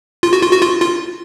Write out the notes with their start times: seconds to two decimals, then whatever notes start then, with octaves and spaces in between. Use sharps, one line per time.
0.23 F4
0.33 F#4
0.42 F4
0.52 F#4
0.62 F4
0.82 F4